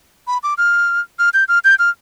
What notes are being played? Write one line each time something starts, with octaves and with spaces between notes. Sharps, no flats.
B5
D6
F6
F6
G6
F6
G6
F6